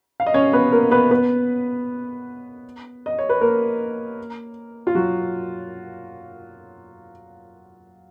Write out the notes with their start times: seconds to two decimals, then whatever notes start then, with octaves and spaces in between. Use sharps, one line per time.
0.20 F5
0.27 D#5
0.34 C#4 C#5
0.53 B3 B4
0.72 A#3 A#4
0.91 B3 B4
1.11 B3 B4
3.06 D#5
3.19 C#5
3.29 B4
3.41 A#3 A#4
4.87 F4
4.95 F#3 F#4